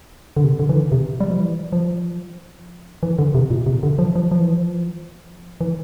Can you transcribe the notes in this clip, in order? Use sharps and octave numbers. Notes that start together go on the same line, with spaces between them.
D3
C3
D3
E3
D3
C3
G3
F3
E3
F3
E3
D3
C3
A#2
C3
D3
F3
F3
F3
E3
F3
E3